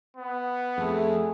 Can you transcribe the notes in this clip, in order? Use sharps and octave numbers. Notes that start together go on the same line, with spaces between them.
B3
F2 A3 G#4